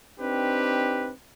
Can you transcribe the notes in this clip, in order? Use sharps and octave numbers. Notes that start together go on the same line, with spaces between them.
C4 D4 D#4 G4 B4